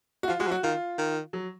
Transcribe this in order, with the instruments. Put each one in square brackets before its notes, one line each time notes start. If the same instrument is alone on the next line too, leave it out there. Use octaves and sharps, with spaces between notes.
[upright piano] F#4
[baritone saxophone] F3 [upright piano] F4
[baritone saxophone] G#3 [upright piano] F#4
[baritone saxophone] F3
[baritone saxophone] F#3 [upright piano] F#4
[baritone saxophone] D#3 [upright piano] F4
[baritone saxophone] D#3
[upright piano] F#3